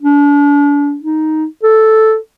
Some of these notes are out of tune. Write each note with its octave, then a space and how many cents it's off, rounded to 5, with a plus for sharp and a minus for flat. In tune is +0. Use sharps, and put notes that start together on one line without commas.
D4 -35
D#4 +5
A4 +0